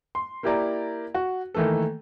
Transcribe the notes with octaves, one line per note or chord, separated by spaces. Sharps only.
C6
A#3 E4 G4 A#4 D5 A#5
F#4
D#3 E3 A3 A#3 A4